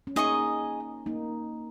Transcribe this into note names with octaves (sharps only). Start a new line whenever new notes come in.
C#4
A#3 D#4 G#4 D#5 C#6
A#3 D#4